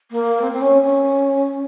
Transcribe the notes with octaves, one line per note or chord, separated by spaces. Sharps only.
A#3
C4
C4
C#4
C#4